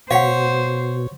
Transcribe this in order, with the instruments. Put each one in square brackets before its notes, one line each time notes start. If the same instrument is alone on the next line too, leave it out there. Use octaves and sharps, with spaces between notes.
[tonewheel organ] B2 [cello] C5 [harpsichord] C#5 [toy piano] F5 F#5